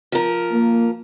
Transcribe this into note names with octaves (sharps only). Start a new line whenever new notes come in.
F3 A#4
A#3